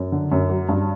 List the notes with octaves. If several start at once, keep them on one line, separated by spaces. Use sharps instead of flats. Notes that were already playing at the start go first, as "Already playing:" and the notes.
Already playing: F#2
D3
F#2
F#3
G2